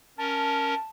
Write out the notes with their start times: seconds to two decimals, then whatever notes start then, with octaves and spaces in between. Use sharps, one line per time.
0.18 C#4 A#4 A5